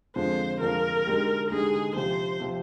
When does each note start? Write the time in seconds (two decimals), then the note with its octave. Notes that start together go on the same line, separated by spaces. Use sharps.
0.16 F2 D3 G#3 C4 F4 C5
0.61 F2 D3 G#3 C4 F4 A#4
1.07 D3 G#3 D#4 G4
1.50 D3 G#3 D#4 G4 G#4
1.96 C3 F3 C4 G4 C5
2.40 C3 F3 C4 G4